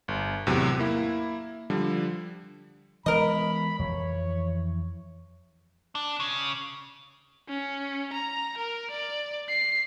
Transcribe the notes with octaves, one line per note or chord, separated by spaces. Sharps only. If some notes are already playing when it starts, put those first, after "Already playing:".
G1
E2 A2 C3 F#3
A#3 E4
D3 F3 G3
E3 G#3 B3 A#4 D#5 B5
F2 E3 C#5
D4
C#3
C#4
A#5
A#4
D5
C7